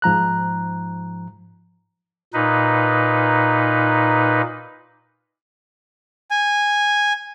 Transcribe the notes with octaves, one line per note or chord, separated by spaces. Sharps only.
G#2 F3 A#5 F#6
A#2 D#4 B4
G#5